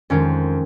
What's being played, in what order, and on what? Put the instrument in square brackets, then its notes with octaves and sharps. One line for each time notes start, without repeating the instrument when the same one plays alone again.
[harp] F2 D#3 G#3 C#4